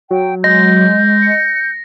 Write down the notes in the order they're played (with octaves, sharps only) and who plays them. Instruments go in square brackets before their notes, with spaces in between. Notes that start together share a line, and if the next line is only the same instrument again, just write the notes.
[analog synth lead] F#3 [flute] G5
[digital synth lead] G#3 [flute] G6 [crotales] A#6
[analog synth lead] C#7